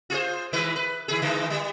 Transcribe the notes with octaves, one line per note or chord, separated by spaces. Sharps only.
F4 G#4 C5
D#3 G#3 B4
B4
D#3 G#4
D3 E3 G#3
G3